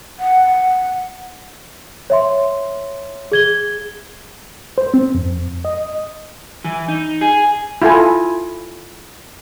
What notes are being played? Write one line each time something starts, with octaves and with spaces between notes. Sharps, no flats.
F#5
C#5 E5 C6
G#4 G#6 G7
C5
C4
F2
D#5
E3
D#4
G#4
E4 F4 A4 G#5